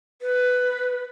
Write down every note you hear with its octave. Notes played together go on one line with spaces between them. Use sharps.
B4